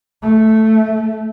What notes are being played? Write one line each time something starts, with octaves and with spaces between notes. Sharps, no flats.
A3